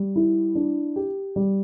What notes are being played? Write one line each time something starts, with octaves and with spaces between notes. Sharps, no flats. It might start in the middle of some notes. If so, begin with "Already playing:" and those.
Already playing: G3
E4
D4
G4
G3